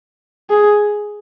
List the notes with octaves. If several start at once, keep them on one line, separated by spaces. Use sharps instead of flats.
G#4